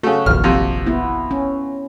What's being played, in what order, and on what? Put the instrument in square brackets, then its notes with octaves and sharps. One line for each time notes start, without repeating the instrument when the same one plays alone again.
[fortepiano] C#3 A3 [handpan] F#4
[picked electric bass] F1 A#1 D#2 [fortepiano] F6
[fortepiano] F2 C3
[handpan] B3 E4
C#4